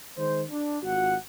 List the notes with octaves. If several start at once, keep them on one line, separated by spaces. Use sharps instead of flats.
D#3 G#3 C5
D4
G#1 F4 F#4 F#5